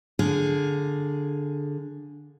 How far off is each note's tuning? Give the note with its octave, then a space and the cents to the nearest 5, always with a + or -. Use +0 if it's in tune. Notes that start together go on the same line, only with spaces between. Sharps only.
D3 +0 G#4 +5 F5 +20